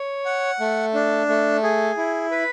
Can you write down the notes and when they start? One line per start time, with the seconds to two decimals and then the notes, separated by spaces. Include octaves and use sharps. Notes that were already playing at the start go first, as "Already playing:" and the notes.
Already playing: C#5
0.25 F#5
0.60 A3
0.94 D4
1.29 A3
1.63 G#4
1.97 E4
2.31 B4